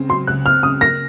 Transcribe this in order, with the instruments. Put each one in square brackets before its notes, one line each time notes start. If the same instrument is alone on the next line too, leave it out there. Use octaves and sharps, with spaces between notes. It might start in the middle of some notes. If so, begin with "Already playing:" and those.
Already playing: [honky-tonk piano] C#2 C#3 C4
[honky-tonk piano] F#3 [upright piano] C6
[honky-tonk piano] C#2 [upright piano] F#6
[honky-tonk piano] C4 [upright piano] F6
[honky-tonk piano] C#3 [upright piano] D#6
[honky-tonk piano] A#3 [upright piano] A#6